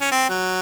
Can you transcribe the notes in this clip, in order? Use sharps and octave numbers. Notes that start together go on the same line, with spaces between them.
C#4
C4
F#3